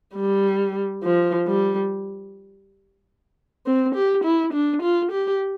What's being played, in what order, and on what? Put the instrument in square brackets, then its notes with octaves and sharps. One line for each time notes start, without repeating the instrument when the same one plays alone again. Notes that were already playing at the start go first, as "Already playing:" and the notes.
[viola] G3
F3
G3
C4
G4
E4
D4
F4
G4